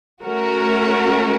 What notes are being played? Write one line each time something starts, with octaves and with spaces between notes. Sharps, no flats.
A3 C#4 F#4 A#4